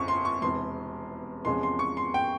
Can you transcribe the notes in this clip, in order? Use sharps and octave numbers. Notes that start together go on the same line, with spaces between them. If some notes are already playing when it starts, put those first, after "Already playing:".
Already playing: G1 F2 C#3 C#6
C6
C#6
E1 E2 C3 C6
E2 C3 F3 G#3 C#4 C6
C6
C#6
C6
G5